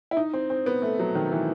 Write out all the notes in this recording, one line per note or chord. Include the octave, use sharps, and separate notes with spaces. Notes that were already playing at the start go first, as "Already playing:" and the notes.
E4
D#4
C4
C4
B3
A3
F#3
D#3
E3